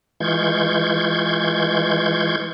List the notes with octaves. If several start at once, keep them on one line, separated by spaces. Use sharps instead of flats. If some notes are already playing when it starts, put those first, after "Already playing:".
E3 G#3 F4 C#6 G6 G#6